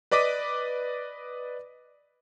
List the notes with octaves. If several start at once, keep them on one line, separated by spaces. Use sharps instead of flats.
B4 D5 D#5 D6 B6 D#7